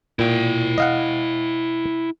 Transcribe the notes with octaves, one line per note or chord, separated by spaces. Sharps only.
A#2 E4 G5
D#5 F5 F#5